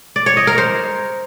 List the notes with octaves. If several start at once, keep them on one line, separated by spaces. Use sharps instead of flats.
D5
C#5
D#5
A#4
C5